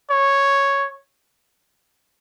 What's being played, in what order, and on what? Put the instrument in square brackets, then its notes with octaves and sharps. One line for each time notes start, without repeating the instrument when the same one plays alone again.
[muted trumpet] C#5